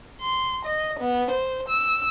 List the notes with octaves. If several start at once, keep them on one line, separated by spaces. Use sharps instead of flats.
C6
D#5
B3
C5
E6